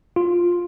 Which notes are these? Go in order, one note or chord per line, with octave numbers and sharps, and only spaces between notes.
F4